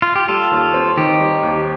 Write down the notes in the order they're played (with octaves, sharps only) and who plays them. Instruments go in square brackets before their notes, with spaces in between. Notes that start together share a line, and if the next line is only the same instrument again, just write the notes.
[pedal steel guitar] F4
G4
[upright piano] G3 [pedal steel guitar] F4 A4
[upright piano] D#2
C4
[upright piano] D#3 [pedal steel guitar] D#4 G4
[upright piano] G3
D#2